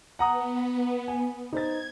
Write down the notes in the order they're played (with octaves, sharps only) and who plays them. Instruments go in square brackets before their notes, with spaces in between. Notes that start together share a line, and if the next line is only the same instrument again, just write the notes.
[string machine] B3 [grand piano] F#5 A#5 D#6
[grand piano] G#5
[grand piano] D#4 C5 A6 [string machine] G#6